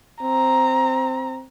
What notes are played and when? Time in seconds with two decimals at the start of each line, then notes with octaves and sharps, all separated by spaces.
0.22 C4 A#5